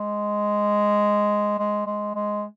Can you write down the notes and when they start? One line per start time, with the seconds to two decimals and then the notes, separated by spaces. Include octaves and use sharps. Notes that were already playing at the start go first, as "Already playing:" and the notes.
Already playing: G#3
1.59 G#3
1.86 G#3
2.15 G#3